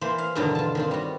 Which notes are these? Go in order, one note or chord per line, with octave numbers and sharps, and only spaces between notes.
E3 A#3 C5 B5 C6
F5
E2 G2 B2 D3 D#3 F#3
F4 A5
D#3 C4 F4
G3 F#4